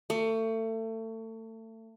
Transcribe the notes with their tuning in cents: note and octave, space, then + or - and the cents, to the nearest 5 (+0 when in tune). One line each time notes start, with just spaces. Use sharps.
A3 +30